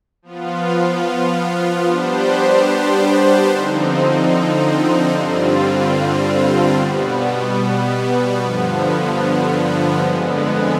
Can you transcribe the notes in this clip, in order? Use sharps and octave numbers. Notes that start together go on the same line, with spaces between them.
F3 B3 F4
G3 B3 D4 G4 C5
D3 F3 C4 D#4
G2 D3 G3 C4 F4
B2 G3 B3
G2 D3 F3 B3
F2 D3 G#3 B3